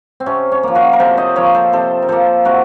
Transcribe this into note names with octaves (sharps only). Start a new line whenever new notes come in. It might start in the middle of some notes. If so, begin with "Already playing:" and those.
C4
C3 C#4
C#4
F3 A#3
F#4 A#4
A#4
C3 A4 C5
C5 D#5
F3 A#3 A#4 C#5
A4 C5
C3 A4 C5
A#4
F3 A#3 A4 C5
C3 F#4 A#4